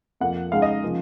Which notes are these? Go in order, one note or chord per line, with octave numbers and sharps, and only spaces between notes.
F2 F3 A#3 F#5
C#3 G#3 D#4 F5
D#5
C#3 F3 A#3